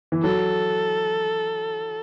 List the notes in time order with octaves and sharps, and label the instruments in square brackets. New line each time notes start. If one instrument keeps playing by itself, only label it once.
[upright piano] E3
[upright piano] F#3 [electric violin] A4